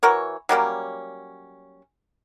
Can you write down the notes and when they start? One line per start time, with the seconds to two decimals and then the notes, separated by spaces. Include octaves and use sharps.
0.03 E3 F#4 A#4 C#5
0.49 F#3 G3 A#3 C#4